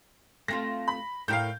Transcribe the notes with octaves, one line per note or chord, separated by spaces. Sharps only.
A3 C4 F4 A#6
B5
A2 E4 A#4 F5 G5 G6